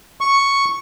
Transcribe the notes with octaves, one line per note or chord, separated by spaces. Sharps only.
C#6